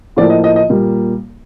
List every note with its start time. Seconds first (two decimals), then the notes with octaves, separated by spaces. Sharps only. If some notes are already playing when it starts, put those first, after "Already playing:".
0.17 A2 F3 A#3 D5
0.30 D#5
0.44 D#5
0.56 D#5
0.69 A#2 G3 A#3